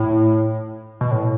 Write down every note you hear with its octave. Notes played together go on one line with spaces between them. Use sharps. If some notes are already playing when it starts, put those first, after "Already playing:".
Already playing: A2
B2
A2